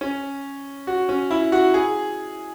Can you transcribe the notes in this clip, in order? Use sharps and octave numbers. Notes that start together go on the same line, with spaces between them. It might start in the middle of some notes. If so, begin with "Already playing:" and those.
C#4
F#4
C#4
E4
F#4
G#4